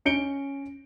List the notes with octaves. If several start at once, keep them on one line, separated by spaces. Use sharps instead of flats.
C#4 C#7 D7 G7